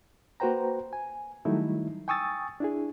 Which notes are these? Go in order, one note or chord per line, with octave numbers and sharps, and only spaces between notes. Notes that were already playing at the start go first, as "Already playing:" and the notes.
A#3 F#4 B4 C5 G5 A#5
G#5
D#3 F#3 G3 A3 D#4 E4
G5 G#5 C#6 D#6 E6 A6
D4 E4 G#4